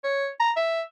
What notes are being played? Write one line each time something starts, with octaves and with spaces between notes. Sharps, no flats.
C#5
A#5
E5